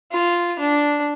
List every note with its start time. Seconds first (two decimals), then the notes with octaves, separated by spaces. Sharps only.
0.12 F4
0.59 D4